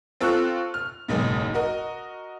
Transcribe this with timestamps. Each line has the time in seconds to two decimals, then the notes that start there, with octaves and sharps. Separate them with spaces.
0.21 C4 F4 A4 C#6 E6 F#6
0.74 F6
1.08 F#1 B1 G#2
1.54 F#4 A#4 D#5